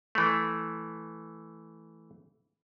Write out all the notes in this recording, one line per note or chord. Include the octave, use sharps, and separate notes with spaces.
E3 A3